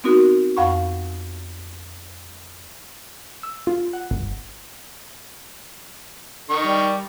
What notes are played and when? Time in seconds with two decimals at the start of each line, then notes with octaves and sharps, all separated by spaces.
0.04 B3 C4 D#4 F#4 A#4
0.57 F2 F5 F#5 B5 C#6
3.43 E6
3.67 F4
3.93 F#5
4.11 G1
6.50 D#3 C#6
6.65 G3